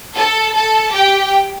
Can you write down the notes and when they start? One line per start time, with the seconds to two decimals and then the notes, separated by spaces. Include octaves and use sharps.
0.15 A4 A5
0.54 A4 A5
0.92 G4 G5